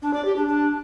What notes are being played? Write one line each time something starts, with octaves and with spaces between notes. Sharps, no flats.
D4
D5
G4
D4
D4